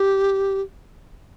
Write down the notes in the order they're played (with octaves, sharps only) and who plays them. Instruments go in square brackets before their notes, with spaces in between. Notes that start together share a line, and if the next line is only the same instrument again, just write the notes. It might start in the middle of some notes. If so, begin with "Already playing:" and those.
Already playing: [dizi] G4